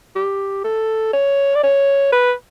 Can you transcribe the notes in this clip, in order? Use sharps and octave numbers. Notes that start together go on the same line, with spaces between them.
G4
A4
C#5
D5
C#5
B4